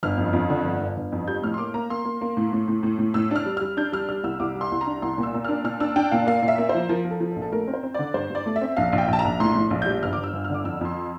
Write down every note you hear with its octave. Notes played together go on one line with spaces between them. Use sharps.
G1 F6
F2
F2
D3
G1
G1
G1
F2
G3 G6
A2 F6
C6
A#3 D6
A#3 A#5
A#3 C6
A#3
A#3
A2
A2
A2
A2
A2
A2 E6
D4 F6
G3
G3 F6
D4 G6
G3 F6
G3 F6
C2 E6
C2 D6
G3
C6
C2
A#5
D4
C2 C6
A#2
E6
A#2
D4 F6
A#2 F6
D4 E6
D4 G5
A#2 F5
A#3 F5
A#2
E5
A#3
C5
F3
F3 A#4
F3
A4
F3
A4
A#1
A4
A3 A#4
C4
C5
C4
D3 D5
G2 C5
G2 D5
A3
E5
C4
A#1 F5
A#1
G5
A#1
A5
A#5
A#1
A2 C6
A2
A#1
G3 G6
G1 F6
G1 D6
E6
G1
F6
D3 D6
F2 E6
F2 C6